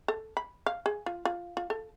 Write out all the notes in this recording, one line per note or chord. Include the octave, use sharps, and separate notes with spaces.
A4
B5
F5
G#4
F4
F4
F4
A4